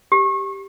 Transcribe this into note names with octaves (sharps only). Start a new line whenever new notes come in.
G4